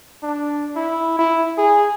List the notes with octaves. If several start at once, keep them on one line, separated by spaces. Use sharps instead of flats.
D4
E4
E4
G#4